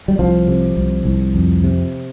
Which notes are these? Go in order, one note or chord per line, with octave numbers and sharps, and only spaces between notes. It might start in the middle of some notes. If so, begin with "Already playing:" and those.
G3
C2 F3
C3
C2
C2
F2
C3